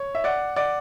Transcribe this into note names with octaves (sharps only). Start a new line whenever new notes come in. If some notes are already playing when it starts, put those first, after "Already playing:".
Already playing: C#5
E5
D5 F#5
D5 F#5